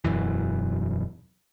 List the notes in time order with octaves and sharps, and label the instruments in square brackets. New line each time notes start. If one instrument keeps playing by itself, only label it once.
[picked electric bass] E1 F#2 E3